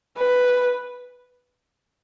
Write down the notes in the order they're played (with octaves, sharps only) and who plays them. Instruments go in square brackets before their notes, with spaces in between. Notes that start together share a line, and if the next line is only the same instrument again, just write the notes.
[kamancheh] B4